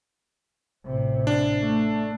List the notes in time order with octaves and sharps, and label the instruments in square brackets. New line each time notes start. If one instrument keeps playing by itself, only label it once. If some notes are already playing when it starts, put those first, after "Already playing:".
[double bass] A1 C3
[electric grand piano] D4
[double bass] A3